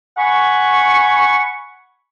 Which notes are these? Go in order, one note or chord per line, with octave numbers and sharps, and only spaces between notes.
F#5 G#5 B5 C#6